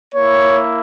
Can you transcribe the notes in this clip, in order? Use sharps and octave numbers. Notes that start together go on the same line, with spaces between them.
A#3 E4 C#5